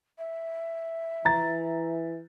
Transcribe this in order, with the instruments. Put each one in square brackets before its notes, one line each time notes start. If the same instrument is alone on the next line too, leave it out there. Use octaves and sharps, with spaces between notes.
[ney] E5
[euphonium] E3 [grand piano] A#5 A6